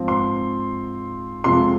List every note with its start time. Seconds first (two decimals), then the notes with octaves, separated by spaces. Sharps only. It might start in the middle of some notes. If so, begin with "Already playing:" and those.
Already playing: G#2 F3 C4
0.08 C6
1.44 F2 C3 F3 G#3 C6